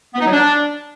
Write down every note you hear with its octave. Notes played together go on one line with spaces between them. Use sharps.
B3
D#4
F#3
D4